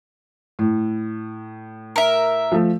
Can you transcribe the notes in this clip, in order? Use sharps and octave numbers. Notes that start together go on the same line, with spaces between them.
A2
A#4 E5
F3 A3